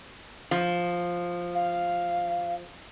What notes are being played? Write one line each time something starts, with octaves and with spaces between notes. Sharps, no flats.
F3
F5